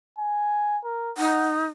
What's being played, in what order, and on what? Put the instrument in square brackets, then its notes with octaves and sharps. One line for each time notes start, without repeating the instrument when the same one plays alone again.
[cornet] G#5
A#4
[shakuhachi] D#4 [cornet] F#5